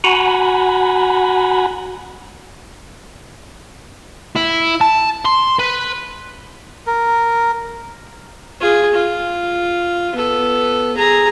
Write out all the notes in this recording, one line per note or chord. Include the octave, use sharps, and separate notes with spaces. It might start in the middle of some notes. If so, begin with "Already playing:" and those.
F#4 F#5 G#5 A#5 B5
E4
A5
C6
B4
A#4
F4 G#4
F4
B3 A4
G#4 A#5